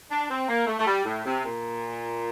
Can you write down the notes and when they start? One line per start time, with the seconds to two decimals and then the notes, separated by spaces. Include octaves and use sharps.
0.10 D4
0.29 C4
0.48 A#3
0.67 A3
0.79 A3
0.86 G3
1.05 A2
1.25 C3
1.44 A#2